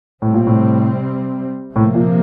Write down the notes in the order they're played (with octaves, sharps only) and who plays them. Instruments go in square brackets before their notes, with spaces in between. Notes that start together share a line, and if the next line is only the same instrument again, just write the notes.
[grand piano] A2 [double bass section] C3 G3 C4
[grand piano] A#2
A2
[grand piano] A2 [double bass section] C3 F3 A#3
[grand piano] A#2